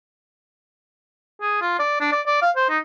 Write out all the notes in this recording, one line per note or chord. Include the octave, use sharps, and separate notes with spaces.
G#4
F4
D5
D4
D5
D5
F5
C5
D#4